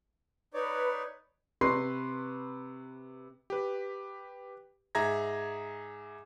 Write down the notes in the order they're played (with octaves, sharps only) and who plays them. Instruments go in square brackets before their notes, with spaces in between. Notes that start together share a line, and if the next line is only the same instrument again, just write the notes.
[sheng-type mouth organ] D#4 C#5 D5 [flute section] B4
[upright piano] C3 B4 C6 C#6 C7
[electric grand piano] G4 B4
G#2 G#4 E5 A#5 G#6 A#6